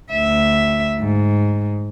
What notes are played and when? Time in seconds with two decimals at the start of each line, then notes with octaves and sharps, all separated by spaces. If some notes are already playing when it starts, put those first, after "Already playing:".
0.13 D2 E5
0.99 G#2